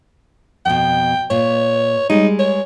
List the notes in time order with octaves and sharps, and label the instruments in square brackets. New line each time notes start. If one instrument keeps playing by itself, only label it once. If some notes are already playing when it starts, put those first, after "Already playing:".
[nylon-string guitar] F2 B2 [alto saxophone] G5
[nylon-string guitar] A#2 [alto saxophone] C#5
[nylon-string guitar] G3 G#3 [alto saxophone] D#4
[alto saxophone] C#5